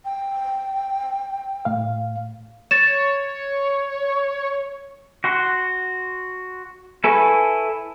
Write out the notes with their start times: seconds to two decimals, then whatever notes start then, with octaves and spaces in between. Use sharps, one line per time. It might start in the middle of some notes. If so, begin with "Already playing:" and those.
0.05 G5
1.65 A2 F5
2.71 C#5 A6 E7
5.24 F#4 F#5 C6
7.04 E4 A4 B4 G#5 C#6